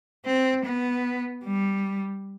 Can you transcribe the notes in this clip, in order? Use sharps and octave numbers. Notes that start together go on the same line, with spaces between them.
C4
B3
G3